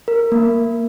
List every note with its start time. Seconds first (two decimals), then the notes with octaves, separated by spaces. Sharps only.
0.08 A#4
0.32 A#3